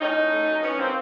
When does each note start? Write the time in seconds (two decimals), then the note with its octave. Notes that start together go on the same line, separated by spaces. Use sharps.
0.01 A2 C#4 D#4
0.17 A2
0.32 A3
0.48 F#3
0.63 A2 B3 C#4
0.78 F#3 A#3 C4